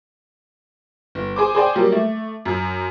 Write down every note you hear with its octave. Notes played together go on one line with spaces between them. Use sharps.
G1
G#4 C5 D6
G#4 C5 D5 G5
F#3 G3 A#3
A3
F#2